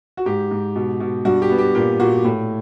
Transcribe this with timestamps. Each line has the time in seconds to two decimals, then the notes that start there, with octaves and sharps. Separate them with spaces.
0.17 F#4
0.26 G#2 G4
0.51 G#2
0.76 B2
1.00 B2
1.25 G2 F#4
1.42 G4
1.50 B3
1.58 G4
1.75 A#2 G4
2.00 A#2 F#4
2.25 A2